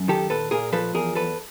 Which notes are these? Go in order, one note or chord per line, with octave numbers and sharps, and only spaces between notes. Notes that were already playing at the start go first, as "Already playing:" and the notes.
Already playing: F#2
D#3 G4 A4
A#2 A4 B4
A#2 G#4 A#4
F3 A4 B4
E2 G#4 A#4
E2 A4 B4